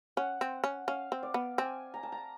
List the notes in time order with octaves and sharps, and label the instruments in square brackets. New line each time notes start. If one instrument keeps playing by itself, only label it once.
[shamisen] C#4 [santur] F#5
[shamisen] C4
C#4
[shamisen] C#4 [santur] F5
[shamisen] C4
[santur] D5
[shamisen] B3
[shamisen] C4 [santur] G#5
[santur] A#5
A5
A#5